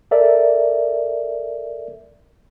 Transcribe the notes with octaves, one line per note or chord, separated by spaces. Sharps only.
A4 A#4 D5 E5